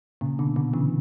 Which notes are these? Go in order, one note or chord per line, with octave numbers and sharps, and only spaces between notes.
A#2 C#3
B2 D3
B2 D3
C#3 E3